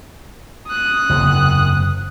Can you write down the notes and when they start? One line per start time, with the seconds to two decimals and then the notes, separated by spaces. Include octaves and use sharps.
0.68 D#6 F#6
1.09 F#1 E2 C3